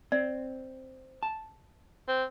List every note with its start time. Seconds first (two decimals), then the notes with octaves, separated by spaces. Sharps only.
0.12 C4 D5
1.23 A5
2.08 C4